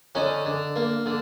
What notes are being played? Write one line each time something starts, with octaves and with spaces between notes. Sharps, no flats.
D3 C#4 D#4
D3
A#3
D3